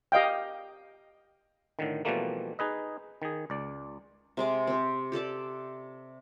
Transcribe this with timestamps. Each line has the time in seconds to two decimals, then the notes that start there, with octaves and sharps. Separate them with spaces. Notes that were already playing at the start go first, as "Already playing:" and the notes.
0.12 G4 D#5 F5 G5
1.79 A2 D3 D#3
2.05 B2 E3 F3 G3 A3 A#3
2.59 D#4 G#4 B4 D#5
3.22 D#3 G#4
3.50 C#2 D5
4.37 C3 G#3 D6
4.67 C4 G4
5.12 G4 A4 D5 A5